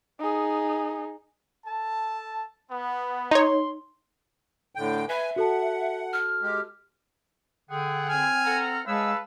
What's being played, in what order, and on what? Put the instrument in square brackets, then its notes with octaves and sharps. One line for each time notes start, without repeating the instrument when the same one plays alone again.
[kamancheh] D#4 G#4
[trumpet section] A4 A5
B3
[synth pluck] D#4 C#5 [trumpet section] C6
[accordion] A2 D3 G5
[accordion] B4 G#5 [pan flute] E5
[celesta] F#4 A4 A5 [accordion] F#5
[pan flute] F6
[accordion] G#3 G4
[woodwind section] D3 G#4 [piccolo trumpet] F#5 [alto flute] G5
[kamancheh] C4 F6 [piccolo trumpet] G#5
[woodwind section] A4 F#5 A#5
[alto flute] G#3 [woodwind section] G#4 C#5 E6 [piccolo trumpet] B4 [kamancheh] F5 A5